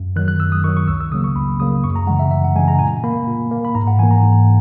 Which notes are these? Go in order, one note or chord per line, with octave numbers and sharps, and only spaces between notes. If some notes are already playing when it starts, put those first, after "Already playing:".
Already playing: F#2
D#3 F#3 F#6
F#6
F#2 E6
D#6
D#3 F#3 C#6
C#6
C#2 E6
E6
C#3 F#3 A#3 D#6
C#6
C#2 B5
C#3 F#3 A#3 D#6
F#2 C#6
A#5
C#3 E3 G#3 F#5
E5
F#2 E5
F#5
C#3 E3 G#3 G#5
A#5
A#2 G#5
A#3 B5
A#2
A#3
B5
G#2 A#5
F#5
E3 A#3 G#5
A#5
G#2